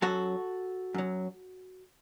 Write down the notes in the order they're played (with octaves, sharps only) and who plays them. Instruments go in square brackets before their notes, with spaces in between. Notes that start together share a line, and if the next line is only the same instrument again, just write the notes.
[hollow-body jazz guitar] F#2 F#3 F#4 A4
F#2 F#3